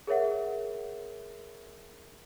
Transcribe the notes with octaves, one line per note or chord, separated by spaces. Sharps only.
G#4 A#4 C#5 E5 F#5